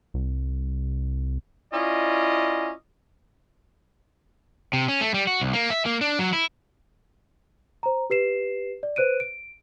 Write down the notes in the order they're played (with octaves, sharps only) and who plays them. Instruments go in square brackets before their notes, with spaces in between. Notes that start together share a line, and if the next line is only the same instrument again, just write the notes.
[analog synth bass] C2
[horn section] C#4 E4 F4 D5 D#5
[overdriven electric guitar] C3
C#4
A3
G3
F#4
C2
A#3
E5
A#3
D4
F#3
E4
[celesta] C5 A#5
G4 B4 C7 E7
D5
B4 C5 F#6 D7 D#7
D7